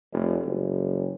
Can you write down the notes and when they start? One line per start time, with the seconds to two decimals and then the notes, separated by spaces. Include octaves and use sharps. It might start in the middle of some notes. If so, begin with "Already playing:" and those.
0.12 F1
0.45 F#1